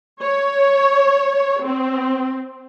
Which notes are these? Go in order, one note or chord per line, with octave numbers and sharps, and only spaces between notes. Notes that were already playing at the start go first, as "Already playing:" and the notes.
C#5
C4